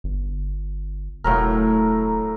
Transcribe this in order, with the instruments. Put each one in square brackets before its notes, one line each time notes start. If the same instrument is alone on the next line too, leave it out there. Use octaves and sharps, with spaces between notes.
[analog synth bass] G1
[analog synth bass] E1 [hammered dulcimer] A2 F#3 A#4